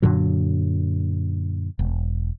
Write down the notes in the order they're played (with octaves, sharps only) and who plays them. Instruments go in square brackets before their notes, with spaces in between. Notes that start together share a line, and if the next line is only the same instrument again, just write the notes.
[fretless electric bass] F#2 A#2 D3 F#3
E1